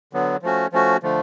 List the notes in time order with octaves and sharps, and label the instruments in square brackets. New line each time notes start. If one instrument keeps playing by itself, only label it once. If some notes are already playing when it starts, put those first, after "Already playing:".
[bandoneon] D3 F#3 B3
F3 A3 C#4 F#4
F3 A3 C#4 F#4
D3 F3 A3